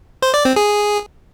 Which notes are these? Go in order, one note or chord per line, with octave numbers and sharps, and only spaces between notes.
C5
D5
C4
G#4